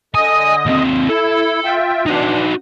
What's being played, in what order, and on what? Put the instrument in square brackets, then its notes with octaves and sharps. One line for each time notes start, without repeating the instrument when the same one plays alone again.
[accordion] D3 D#5 D#6 [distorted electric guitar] G#5
[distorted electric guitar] D#2 C4
[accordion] E4 [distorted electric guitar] A4
[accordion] F4 E5 G5
[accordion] E3 D4 [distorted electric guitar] D#4 F#4